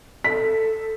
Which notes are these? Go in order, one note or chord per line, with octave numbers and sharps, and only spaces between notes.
A4 B6